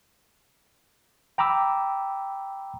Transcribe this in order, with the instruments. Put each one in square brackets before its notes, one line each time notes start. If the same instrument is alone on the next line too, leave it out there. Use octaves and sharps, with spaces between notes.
[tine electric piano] G5 A#5 B5 D6 E6